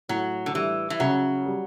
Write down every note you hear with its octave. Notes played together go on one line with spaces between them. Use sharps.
A2 F#3
D3
E3 G3
E3
C#3 F#3
G3